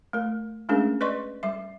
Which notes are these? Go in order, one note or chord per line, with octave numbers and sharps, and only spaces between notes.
A3 A#4
G#3 A3 C#4 D4 G#4 A#4
B4 D5 D#5 C6 C#6
G3 E5